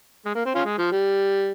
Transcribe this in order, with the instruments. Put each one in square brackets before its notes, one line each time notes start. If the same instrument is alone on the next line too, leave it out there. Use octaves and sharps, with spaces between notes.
[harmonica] G#3
A#3
C4
C#4 F4
G#3
F3
G3